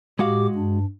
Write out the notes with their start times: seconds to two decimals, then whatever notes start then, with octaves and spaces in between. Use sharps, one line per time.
0.19 A2 G#3 F#4 G4 F5 D6
0.55 G2 D4